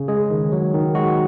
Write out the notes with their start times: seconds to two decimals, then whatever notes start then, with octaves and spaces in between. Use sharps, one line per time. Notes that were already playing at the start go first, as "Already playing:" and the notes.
Already playing: C#3
0.08 G#3 G#4
0.30 D#3
0.52 F#3
0.74 D#3
0.95 G#3 F#4